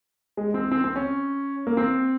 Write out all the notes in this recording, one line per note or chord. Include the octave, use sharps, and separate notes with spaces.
G#3
C4
C4
C4
C#4
A#3
C4